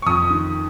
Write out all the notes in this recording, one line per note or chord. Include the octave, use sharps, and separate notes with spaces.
C#6
F2 D#6
D#3